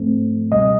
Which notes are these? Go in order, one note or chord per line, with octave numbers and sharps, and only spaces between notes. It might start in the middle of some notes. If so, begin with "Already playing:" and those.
Already playing: G#2 F3 A3 C4
C#2 B2 G3 D#5